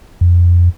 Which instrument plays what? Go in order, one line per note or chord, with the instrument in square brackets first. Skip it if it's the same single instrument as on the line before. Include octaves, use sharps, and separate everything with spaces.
[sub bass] F2